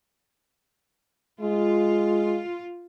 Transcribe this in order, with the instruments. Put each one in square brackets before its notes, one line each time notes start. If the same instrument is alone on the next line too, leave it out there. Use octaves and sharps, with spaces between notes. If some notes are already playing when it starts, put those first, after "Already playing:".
[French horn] G#3 [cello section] F4